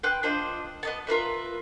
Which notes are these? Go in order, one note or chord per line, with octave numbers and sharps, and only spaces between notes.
B4 G5 C6 F#6
D4 F4 C5 D#5
B3 D#5 A5
F4 A#4 B4 E5